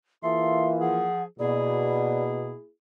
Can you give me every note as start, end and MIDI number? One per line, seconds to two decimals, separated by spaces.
0.23 1.07 52
0.23 1.07 58
0.23 1.07 65
0.23 0.68 68
0.23 0.68 69
0.23 0.79 76
0.23 0.68 84
0.80 1.24 53
0.80 1.24 68
0.80 1.23 78
1.39 2.52 47
1.39 2.69 58
1.39 2.69 64
1.39 2.69 68
1.39 2.23 74